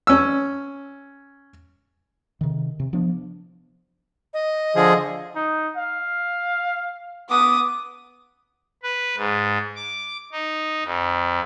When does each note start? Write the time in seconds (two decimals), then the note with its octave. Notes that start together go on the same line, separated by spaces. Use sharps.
0.07 C#4 E6
2.41 C3 D#3
2.80 C3
2.93 F3 B3 D4
4.34 D#5
4.76 D3 F3 G#4
5.35 D#4
5.76 F5
7.30 B3 D6 D#6
8.83 B4
9.17 G#2
9.76 D6
10.32 D#4
10.84 F2